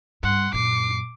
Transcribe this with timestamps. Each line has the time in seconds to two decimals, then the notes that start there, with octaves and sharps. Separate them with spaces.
0.23 G2 F#5 C6
0.54 F#2 A#2 D6 C7